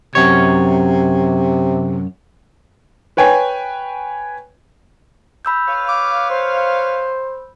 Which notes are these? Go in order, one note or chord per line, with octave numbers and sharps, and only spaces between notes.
F#2 C3 C#5
B4 C#5 G5 G#5
B5 E6 G6
B4 C#5 F5
D6
C5